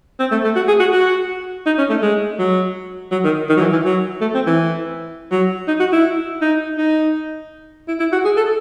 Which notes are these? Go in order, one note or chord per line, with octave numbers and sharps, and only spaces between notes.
C4
A3
A3
F#4
G#4
F#4
F#4
D#4
C#4
A3
G#3
F#3
F#3
D#3
D#3
F#3
E3
E3
F#3
A3
C4
E3
F#3
D#4
F#4
E4
D#4
D#4
E4
E4
F#4
G#4
A4